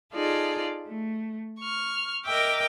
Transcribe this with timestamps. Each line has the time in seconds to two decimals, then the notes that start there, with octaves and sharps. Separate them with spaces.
0.13 D#4 F4 G#4 A4 D5
0.89 A3
1.60 C#6 F6
2.25 A#4 D#5 E5 G5 D6